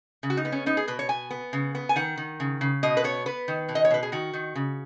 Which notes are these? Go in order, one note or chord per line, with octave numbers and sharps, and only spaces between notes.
C#3
F#4
D#4
B3
C#4
B3 D#4
G#4
B2 B4
C#5
B3 G#5
B3
C#3
B3
G#5
D#3 F#5
D#3
C#3
C#3
B2 D#5
B4
B3 C#5
B3 B4
D#3
B2
D#5
C#5
B2 B4
G#4
D#3 F#4
D#3
C#3